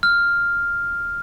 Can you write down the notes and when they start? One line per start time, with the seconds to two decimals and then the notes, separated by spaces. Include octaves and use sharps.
0.03 F6